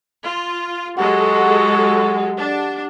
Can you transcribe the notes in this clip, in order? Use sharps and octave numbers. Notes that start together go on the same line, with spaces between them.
F4
F#3 G#3 F#4 G4 A4 F#5
D4